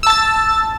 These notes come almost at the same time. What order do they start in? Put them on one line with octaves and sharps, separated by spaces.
E6 A5 A6